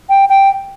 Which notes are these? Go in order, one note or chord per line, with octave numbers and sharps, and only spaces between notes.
G5
G5